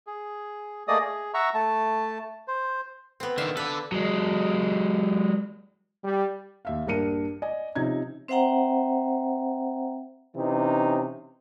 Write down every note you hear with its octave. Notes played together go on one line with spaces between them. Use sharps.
G#4
A3 A#3 G#4 D5 D#5 D#6
G#4
E5 F#5 A#5 C#6 E6
A3 A5
C5
B3 C4
D3 D#3 E5 F5
D3 A4 B4
F#3 G#3
G3
D#2 E5 F5
A#1 G2 D4 A#4 C#7 D#7
D5 D#5 G#5
C3 F3 C#4 D#4 G#6
C4 C5 E5 F#5 G5 A#5
C3 E3 C#4 D#4